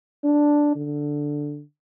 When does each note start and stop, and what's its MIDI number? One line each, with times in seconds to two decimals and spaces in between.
0.24 0.73 62
0.76 1.62 50